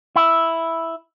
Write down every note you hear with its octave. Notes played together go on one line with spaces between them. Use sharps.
E4